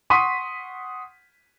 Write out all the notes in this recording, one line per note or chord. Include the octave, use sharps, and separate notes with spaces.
F#5 C6 C#6 D#6 B6 D#7